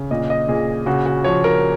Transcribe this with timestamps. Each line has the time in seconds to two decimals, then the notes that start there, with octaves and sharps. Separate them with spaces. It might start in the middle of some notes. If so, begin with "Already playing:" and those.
Already playing: C#3
0.11 A#2 D#5
0.30 D#5
0.48 A#2 G#4
0.86 C#3 F#4
1.06 F#4
1.24 F3 C#5
1.44 A#4